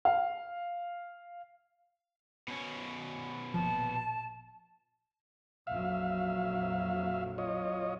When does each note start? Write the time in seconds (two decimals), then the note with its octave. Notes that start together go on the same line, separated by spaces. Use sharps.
0.05 F5
2.48 B2 C#4
3.54 G1 A#2 F3 A5
5.67 A#1 F2 F#3 E5 F5
7.38 F4 C#5 D#5